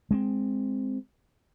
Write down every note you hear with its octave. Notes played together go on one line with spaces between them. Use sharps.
G#3 A#3 C4